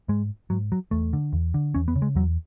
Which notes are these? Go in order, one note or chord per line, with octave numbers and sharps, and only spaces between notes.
G#2 G#3
G#2 F#3
F#3
E2 A3
D3
E2
D3
E2 C#4
B3
C#3
G#3
E2 F#3